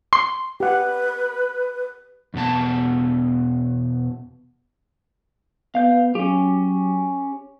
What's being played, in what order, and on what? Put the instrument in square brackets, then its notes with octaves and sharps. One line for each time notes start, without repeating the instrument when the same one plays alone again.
[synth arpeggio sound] C6
[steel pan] G4 F#5 [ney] B4
[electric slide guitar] E2 B2 D#4 A5
[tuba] B3 [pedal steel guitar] F5 G6
[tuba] F#3 [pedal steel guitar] C#4 G4